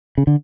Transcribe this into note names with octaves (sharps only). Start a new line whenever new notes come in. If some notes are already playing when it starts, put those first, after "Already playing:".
C#3
D3